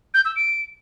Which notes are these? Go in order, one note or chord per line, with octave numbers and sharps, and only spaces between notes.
G6
E6
D7